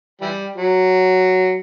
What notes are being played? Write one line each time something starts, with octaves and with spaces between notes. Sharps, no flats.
E3 G3
F#3